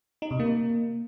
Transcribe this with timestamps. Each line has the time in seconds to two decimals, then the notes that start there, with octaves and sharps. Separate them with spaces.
0.22 D#4
0.31 C3
0.40 A#3